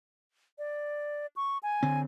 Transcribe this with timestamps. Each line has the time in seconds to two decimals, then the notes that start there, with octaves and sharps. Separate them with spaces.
0.58 D5
1.36 C#6
1.63 G#5
1.83 D3 C4